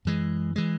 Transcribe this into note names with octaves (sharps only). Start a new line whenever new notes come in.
F#2 E3 G#3
E3 G#3